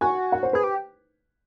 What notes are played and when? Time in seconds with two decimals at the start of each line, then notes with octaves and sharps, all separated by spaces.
0.01 F#4 G#5
0.32 F#5
0.43 C5
0.53 G#4 B4
0.64 G4